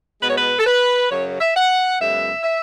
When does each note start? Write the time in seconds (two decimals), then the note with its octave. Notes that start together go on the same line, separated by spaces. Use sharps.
0.21 B2 G#3 B3 B4
0.29 C#5
0.37 B4
0.59 A4
0.67 B4
1.10 F#2 C#3 F#3 C#5
1.41 E5
1.56 F#5
2.00 F#2 C#3 G#3 B3 E5
2.43 E5